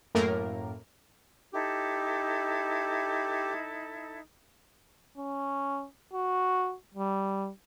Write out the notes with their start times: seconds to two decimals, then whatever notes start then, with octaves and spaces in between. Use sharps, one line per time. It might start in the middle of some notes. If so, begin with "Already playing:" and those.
0.15 F#2 A2 A#3 A#4
1.53 D#4 E4 G4 A4
5.17 C#4
6.13 F#4
6.94 G3